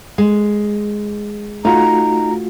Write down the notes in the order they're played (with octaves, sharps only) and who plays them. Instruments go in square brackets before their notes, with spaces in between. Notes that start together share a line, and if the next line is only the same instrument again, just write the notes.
[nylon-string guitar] G#3
[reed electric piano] A3 F4 F#4 [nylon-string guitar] D#4 [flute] A#5